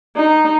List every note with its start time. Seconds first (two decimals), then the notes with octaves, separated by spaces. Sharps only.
0.17 D#4